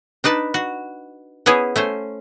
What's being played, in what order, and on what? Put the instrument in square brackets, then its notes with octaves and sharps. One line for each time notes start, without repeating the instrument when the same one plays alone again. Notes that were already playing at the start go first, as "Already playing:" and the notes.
[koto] D4 D#4 B4 A5
F#4
B3 C#4 E4 G#4
A3 C#4 C5